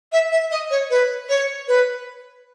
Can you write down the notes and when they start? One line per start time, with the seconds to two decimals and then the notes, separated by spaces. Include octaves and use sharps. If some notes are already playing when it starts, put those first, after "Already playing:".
0.12 E5
0.32 E5
0.51 D#5
0.70 C#5
0.90 B4
1.29 C#5
1.68 B4